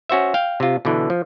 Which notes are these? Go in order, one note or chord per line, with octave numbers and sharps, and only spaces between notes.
C#4 F#4 C5 E5
F5 G5
C3 F4
B2 D3 E3
F3